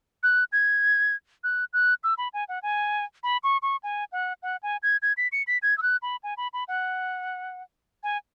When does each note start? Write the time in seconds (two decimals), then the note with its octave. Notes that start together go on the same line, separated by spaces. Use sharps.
0.23 F#6
0.52 G#6
1.44 F#6
1.73 F#6
2.04 E6
2.18 B5
2.34 G#5
2.49 F#5
2.63 G#5
3.23 B5
3.44 C#6
3.62 C#6
3.83 G#5
4.12 F#5
4.43 F#5
4.63 G#5
4.83 G#6
5.02 G#6
5.17 B6
5.32 C#7
5.47 B6
5.63 G#6
5.78 E6
5.83 F#6
6.02 B5
6.23 G#5
6.37 B5
6.53 B5
6.68 F#5
8.03 G#5